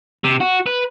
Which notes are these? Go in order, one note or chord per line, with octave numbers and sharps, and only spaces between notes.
C3
F#4
B4